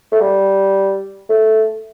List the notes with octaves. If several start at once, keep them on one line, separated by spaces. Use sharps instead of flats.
A3
G3
A3